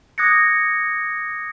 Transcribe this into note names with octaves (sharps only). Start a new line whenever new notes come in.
D6 D#6 F#6 G#6 A#6 C#7